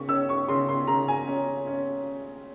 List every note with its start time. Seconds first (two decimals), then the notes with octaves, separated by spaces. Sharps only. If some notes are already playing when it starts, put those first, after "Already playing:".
Already playing: C#3 C#6
0.09 C#4 E6
0.29 C#6
0.48 C#3 C6
0.69 C6
0.87 C#3 A#5
1.08 G#5
1.27 C#4
1.67 C#4